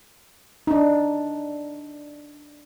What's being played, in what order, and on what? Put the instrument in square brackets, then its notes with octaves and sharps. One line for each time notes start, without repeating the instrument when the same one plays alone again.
[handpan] D4 D#4